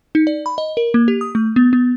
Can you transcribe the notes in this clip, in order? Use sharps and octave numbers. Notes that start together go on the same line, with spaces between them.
D#4
D5
B5
D#5
A#4
A#3
G4
D#6
A3
B3
B3